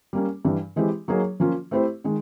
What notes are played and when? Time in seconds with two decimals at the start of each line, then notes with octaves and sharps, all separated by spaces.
0.13 G3 A#3 C#4
0.45 G2 E3 G3
0.76 E3 G#3 C4 E4 G4
1.08 F#3 A#3 D#4 G#4 C#5
1.40 F3 A#3 C#4 F4
1.71 A3 C4 E4 G4 C5
2.04 D#3 G#3